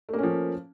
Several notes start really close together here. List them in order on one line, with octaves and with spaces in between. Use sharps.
A3 A#3 C#4 F3